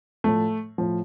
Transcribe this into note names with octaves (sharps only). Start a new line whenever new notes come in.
A2 F3 A3
A2 F3